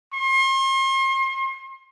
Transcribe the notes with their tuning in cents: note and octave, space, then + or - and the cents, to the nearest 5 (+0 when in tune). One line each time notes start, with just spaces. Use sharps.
C6 +40